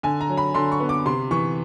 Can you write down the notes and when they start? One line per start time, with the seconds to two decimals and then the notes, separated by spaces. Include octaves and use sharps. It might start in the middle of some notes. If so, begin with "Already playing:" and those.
0.03 D3 G#5
0.21 A#5
0.29 F#3
0.37 B5
0.54 D3 C6
0.72 C#6
0.80 B3
0.89 D6
1.06 C3 C6
1.31 E3 C#6